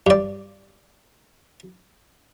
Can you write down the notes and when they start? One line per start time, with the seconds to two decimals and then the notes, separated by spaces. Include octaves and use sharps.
0.07 G2 D5